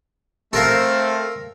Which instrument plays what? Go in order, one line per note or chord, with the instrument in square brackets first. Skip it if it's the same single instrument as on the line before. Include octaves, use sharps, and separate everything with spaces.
[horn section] A3 C4 [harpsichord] A4 A#4 F5